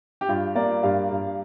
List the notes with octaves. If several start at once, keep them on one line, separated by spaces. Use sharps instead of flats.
G4
G2 F4
A#3 D5
G2 F5
G2